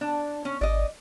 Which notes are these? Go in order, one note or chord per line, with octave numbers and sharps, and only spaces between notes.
D4
C#4
G#1 D5 D#5